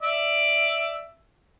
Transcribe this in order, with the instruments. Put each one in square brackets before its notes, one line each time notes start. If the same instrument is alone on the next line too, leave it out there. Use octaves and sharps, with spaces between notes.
[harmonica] D5 E5